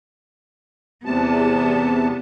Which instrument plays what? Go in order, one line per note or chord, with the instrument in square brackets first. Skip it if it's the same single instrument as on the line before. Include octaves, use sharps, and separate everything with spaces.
[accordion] E2 C3 A5 [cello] B3